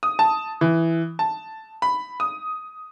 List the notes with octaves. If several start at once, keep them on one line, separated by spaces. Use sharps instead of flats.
D#6
A5
E3
A5
B5
D#6